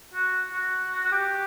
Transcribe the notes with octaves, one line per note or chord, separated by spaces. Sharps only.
F#4
F#4
F#4
G4